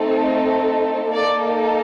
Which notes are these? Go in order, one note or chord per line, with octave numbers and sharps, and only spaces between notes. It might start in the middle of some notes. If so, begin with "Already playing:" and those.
Already playing: A3 C4 D#4 A4
A#3 D#4 A4 D5